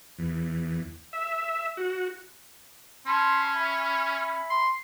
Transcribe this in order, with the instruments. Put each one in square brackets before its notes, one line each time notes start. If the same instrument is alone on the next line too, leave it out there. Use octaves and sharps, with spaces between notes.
[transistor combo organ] E2
E5
F#4
[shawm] C#4 [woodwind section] A5 B5 C6
[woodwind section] E5 G#5 B5
[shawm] C6